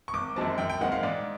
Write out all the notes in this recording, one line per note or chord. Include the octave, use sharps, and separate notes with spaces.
C#6
G#1 D6
F#2 D#3 G#3 C4 A5
F#2 G5
G5
D#3 G#3 C4 F#5
F5
G#2 D5